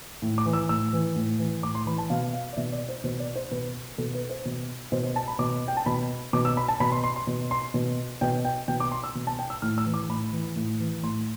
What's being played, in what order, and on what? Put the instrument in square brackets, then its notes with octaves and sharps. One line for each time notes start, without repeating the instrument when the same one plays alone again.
[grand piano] A2
D6
E3
E6
A2 E6
E3
A2
E3
A2 D6
C6
E3 B5
A5
B2 F5
F5
D5
B2 E5
D5
C5
B2 C5
D5
C5
B2 B4
B2 A4
B4
C5
B2
B2 C5
C5
A5
B5
B2 D6
G5
A5
B2 B5
B2 D6
E6
B5
A5
B2 B5
C6
C6
C6
B2
C6
B2
B2 G5
G5
B2 G5
D6
C6
E6
B2
A5
G5
E6
A2 F6
E6
E3
D6
A2 B5
E3
A2
E3
A2 C6